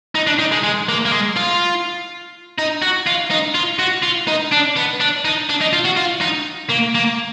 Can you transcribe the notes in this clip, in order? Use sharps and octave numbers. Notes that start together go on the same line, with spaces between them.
D#4
D4
D#4
G#3
G#3
A#3
A#3
G#3
F4
D#4
F#4
F4
D#4
F4
F#4
F4
D#4
D4
B3
D4
D#4
D4
D#4
F4
F#4
F4
D#4
A#3
A#3